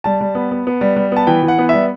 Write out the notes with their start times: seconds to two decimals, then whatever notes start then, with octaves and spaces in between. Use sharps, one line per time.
0.04 G3 A5
0.21 G3
0.35 B3
0.51 B3
0.67 B3
0.81 G3
0.96 G3
1.12 B3 A5
1.27 E3 G5
1.43 E3
1.48 F#5
1.58 B3
1.69 G3 E5